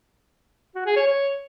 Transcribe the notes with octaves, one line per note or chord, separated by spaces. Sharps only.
F#4
G#4
C#5
C#5